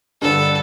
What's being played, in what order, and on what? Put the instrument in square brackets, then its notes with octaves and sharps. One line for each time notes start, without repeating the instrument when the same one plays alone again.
[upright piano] G2 D3 G3 [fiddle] A4